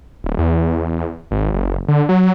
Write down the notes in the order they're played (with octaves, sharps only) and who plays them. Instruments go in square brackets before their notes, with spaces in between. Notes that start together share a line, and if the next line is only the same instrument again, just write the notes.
[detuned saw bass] D1
E2
G#1
F#1
D3
F#3